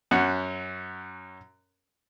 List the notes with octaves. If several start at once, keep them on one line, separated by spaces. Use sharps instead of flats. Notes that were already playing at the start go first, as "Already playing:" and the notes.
F#2 C#4 F#5